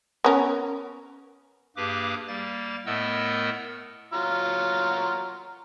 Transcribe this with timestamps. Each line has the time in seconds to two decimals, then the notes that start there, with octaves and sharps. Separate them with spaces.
0.24 B3 C#4 A#4
1.76 G2 A#3 G4 G#4 B4 D6
2.28 G3 A#3 A6
2.86 A2 A3 B3 A#4 D#5 E6
4.13 F#3 F4 A#5